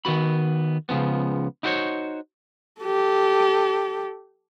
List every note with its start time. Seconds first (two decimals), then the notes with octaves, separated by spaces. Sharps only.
0.05 D#3 B3 F#4 B5
0.89 C#2 G2 C#3 F3 B3
1.63 D#4 E4 F#4 A4 C5 C#5
2.81 G4 A4